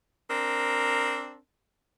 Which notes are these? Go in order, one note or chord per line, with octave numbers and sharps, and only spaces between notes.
C4 D4 A#4